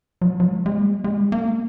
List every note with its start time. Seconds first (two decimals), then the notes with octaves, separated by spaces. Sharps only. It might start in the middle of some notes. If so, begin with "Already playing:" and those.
0.22 F#3
0.40 F#3
0.49 G#3
0.66 G#3
0.77 A#3
1.04 G#3
1.32 A#3